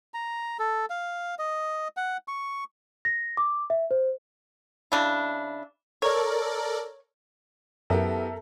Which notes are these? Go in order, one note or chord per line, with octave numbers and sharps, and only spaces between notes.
A#5
A4
F5
D#5
F#5
C#6
A#6
D6
E5
C5
C#3 D4 E4
A4 A#4 C#5 D5
F#2 B3 E4 G4 A4 A#4 E5